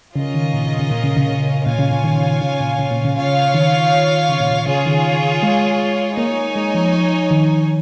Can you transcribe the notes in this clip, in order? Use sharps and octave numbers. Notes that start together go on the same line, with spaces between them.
C#3 C#4 F4 A#4 D#5
D#3
A#2
C#3
C#3
A#2
C#3
C#3
A#2 F4 C#5 F5 G#5
C#3
C#3
D#3
C#3
A#2
C#3
A#2
C#3
F4 C#5 F5
D#3
C#3
A#2
C#3
C#3 F4 G#4 C#5
D#3
G#3
A#3 D#4 C#5 G#5
G#3
F3
D#3